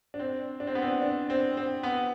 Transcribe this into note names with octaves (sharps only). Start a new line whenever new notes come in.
D4
C4
D4
C4
B3
C4
D4
C4
C4
B3